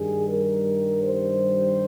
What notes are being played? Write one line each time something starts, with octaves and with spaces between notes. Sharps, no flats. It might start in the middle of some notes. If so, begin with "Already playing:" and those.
Already playing: G2 D#3 G3 G#4
A#4
C5